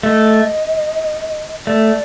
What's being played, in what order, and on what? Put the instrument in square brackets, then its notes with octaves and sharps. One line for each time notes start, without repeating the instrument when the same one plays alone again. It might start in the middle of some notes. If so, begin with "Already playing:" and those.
[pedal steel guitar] A3 [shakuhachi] D#5
[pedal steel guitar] A3 [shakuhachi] D5